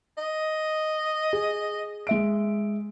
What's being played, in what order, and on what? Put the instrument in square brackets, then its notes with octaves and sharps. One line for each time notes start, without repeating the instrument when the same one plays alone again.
[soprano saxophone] D#5
[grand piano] G#4
G#3 E5 D7